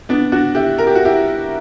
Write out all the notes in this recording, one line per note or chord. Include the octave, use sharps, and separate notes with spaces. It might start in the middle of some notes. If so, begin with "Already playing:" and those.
B3 D4
D4 F#4
E4 G4
A#4
G4
F#4
E4 G4